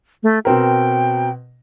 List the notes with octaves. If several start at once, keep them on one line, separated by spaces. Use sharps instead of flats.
A3
B2 C4 A#4 G5